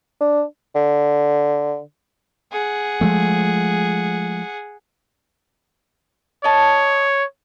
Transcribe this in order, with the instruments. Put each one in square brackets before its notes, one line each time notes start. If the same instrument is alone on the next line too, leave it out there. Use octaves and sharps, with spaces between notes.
[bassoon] D4
D3
[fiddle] G#4 F#5
[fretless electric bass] F3 G#3 A3
[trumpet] C#5 [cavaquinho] D#5 A5